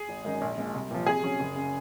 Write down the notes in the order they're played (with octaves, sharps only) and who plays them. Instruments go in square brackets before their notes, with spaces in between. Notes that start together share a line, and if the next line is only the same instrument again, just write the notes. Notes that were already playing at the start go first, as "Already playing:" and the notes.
Already playing: [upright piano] G#4
[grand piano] G#1
F#2 D#3 G#3 D#4
A#1
A#2 G#3
C2
A#2 F3
[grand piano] C3 [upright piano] G#4
[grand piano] F#3 C#4
F#1
C#3